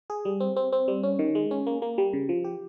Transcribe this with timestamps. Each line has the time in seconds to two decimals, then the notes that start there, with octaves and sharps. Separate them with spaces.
0.10 G#4
0.25 G3
0.40 C4
0.56 C4
0.72 C4
0.88 G3
1.03 C#4
1.19 D#3
1.35 G#3
1.51 C#4
1.67 A#3
1.82 A#3
1.98 G3
2.13 C#3
2.29 F3
2.44 G4